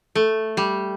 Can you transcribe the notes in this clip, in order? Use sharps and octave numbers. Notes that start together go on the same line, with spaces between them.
A3
G3